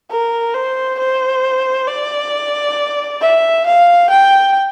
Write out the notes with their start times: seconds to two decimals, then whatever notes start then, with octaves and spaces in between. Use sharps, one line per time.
0.11 A#4
0.55 C5
0.99 C5
1.88 D5
3.21 E5
3.66 F5
4.10 G5